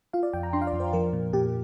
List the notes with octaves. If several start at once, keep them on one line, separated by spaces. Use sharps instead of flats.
F4 F5
D5
F2 G5
A#5
D4 C6
F5
D5
F2
C5
F3 A#4
A#2
A#2 G4